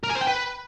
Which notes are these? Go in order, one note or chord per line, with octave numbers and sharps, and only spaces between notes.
A#4
G#5
C5
G5
B4